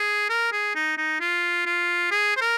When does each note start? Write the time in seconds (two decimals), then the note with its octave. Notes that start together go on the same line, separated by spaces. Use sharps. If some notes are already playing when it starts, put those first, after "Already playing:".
Already playing: G#4
0.29 A#4
0.52 G#4
0.75 D#4
0.98 D#4
1.20 F4
1.66 F4
2.11 G#4
2.37 C5
2.41 A#4